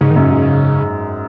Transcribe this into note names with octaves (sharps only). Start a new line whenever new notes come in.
G#2 C#3
D#3
F#2 C#3
G#2